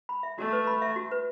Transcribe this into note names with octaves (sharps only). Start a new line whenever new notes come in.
B5
E5
A3 F#4
B4
B5
E5
F#4
B4